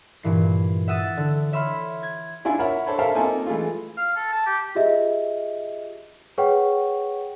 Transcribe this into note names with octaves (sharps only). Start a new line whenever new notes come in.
G2 A#2 E3 C7
E5 F#5 D#6 E6 A6
D3
C#5 E5 B5 C6 F6
G#6
D4 E4 F4 G#5
A#4 C#5 E5 F#5 B5
D4 A4 C5 C#5 B5
A4 A#4 C5 E5 F5 A5
A#3 C4 D#4 F4 A4 G#5
E3 G#3 A3 F4
F5
A4
A5
G4
F4 G4 G#4 D#5 E5
G#4 B4 C#5 F#5 G5 C#6